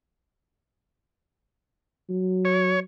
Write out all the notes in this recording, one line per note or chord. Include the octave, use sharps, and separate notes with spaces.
F#3
C#5